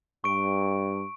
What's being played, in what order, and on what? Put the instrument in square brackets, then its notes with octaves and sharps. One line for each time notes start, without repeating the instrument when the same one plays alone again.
[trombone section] G2 [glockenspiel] C#6 D7